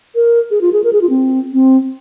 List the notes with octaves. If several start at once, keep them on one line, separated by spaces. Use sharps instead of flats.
A#4
G#4
F4
G#4
A#4
G#4
F4
C4
C4